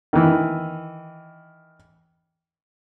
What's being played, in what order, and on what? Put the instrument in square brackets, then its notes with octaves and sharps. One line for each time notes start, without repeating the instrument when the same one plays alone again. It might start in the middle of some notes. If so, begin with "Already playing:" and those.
[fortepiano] D#3 E3